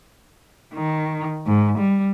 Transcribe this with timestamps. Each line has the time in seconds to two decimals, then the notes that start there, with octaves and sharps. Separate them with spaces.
0.74 D#3
1.46 G#2
1.78 G3